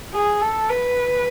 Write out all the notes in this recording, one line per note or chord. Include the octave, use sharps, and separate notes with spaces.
G#4
A4
B4